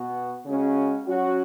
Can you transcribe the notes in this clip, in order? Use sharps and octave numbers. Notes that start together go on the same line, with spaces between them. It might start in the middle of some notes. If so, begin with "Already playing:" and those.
Already playing: B2 B3 F#4
C#3 G#3 C#4 F#4
F#3 C#4 F#4